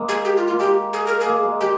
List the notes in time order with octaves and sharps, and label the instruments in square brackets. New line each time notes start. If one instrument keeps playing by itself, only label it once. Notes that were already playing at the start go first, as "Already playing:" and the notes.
Already playing: [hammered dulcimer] G#3 A#3
[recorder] G#4
G4
F4
F4
[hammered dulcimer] A#3
[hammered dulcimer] G#3 [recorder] G4
[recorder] G#4
A#4
G#4
[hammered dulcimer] A#3
G#3
[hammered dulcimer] G#3 [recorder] G4